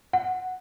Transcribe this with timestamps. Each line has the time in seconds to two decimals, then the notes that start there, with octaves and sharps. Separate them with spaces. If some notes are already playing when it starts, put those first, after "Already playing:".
0.13 F#5